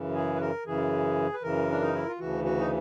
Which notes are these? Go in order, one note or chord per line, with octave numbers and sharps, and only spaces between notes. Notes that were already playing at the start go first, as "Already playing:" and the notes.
Already playing: F#2 C#3 E3
G#4
B4
A#4
F#2 C#3 E3 G#4
B4
F#2 C#3 E3 A#4
D4
D#4
E4
F4
D2 C#3 E3 F#4
F#4
D#4